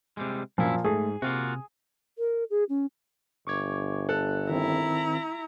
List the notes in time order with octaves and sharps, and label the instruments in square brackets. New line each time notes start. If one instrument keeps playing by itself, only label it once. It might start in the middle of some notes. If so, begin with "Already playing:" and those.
[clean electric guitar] C3 G3 G#3
[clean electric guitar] F#2 E4 [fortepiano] A#2 F3
[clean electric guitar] G#2 [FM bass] A3 [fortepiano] G#4
[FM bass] C3 [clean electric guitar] A#3 F4 F#4
[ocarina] A#4
G#4
C#4
[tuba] G1 [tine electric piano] C#6 D6 G#6
[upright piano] A4 [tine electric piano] F#6
[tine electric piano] D#3 C4 [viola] E4 A#5